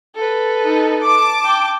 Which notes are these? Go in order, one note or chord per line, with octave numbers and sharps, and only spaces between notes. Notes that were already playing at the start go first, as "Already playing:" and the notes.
A4 B4
D#4
A5 D6
G5